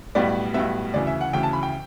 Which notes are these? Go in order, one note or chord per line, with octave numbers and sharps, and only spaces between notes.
B1 A2 G3 B3 D5
B1 A2 G3 B3 E5
D2 C#3 E3 D5
E5
F#5
D2 C#3 E3 G5
A5
B5
G5